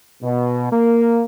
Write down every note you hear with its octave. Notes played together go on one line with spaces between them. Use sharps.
B2
A#3